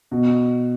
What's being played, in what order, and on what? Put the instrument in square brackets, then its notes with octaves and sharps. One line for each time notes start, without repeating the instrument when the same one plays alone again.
[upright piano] B2